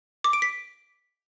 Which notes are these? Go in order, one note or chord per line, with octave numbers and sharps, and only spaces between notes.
D6
D7
B6